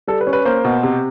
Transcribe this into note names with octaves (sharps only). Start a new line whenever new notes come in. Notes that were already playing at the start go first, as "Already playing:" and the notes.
G3 A4
B4
C#4
B4
A#3 C5
B2
C3